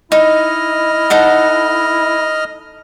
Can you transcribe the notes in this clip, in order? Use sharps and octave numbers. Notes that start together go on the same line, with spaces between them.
D#4 E4 D#5 F6
D#4 A4 F#5